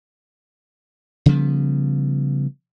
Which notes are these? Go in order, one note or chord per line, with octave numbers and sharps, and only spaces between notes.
C#3 F3 G3 B3